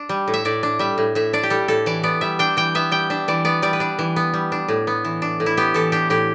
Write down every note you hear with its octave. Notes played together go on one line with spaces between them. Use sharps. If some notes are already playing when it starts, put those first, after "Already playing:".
Already playing: D4
G3
A2
E5
A2 D5
D4
G3 E5
A2
A2 E5
D4 D5
G4
G3 A4
A2 A4
E3 D5
B3 D5
G3 E5
D4 G5
E3 G5
B3 E5
G3 G5
D4 E5
E3 D5
B3 D5
G3 D5
B4
D4 D5
E3
B3
G3
D4
A2
B3
E3
D4
A2
E4
B3 G4
E3 A4
D4 G4
A2 G4